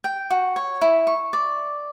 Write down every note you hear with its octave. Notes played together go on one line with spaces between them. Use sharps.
G5
F#4
C#5
E4
C#6
D5